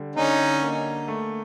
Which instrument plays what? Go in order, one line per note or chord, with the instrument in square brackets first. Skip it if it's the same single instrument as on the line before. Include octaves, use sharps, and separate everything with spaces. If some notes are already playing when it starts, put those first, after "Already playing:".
Already playing: [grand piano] D3 G3
[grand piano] D3 [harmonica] C#4 D#4
[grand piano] A#3
A3